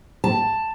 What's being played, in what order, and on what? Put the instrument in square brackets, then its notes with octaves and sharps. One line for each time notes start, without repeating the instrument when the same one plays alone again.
[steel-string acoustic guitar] A5